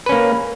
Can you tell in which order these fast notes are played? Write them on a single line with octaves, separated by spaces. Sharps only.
B4 C#4 A#3